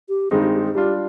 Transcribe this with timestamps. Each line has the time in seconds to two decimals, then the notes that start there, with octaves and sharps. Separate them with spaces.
0.09 G4
0.31 G2 D#3 G#3 C4 D#4 G#4
0.42 G4
0.53 G4
0.64 G#4
0.75 G3 D4 F4 G4